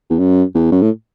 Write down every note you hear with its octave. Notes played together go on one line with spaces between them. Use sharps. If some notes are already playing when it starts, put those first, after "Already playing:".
E2
F#2
E2
F#2
A2